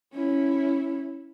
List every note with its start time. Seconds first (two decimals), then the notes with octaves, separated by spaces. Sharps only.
0.14 C#4 E4